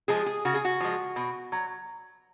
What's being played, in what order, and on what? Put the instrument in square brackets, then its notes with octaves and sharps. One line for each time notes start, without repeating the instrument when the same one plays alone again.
[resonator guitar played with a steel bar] F3 G#3 G#4
G#4
C#3 F#4
G#4
F#4
F3 G#3
B2
F#3